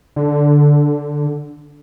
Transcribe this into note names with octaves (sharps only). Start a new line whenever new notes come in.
D3